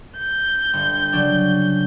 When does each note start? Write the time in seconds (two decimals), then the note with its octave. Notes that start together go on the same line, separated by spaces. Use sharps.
0.19 G6
0.73 G1
1.13 C#3 F#3 D4